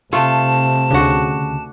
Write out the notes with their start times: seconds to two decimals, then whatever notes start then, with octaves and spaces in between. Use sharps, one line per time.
0.13 C3 A3 F4 A5
0.90 D2 C#3 D4 F#4